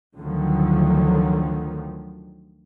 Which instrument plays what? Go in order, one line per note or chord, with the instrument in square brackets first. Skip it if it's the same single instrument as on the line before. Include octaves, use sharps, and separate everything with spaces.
[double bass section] D2 D3 D#3 F3 F#3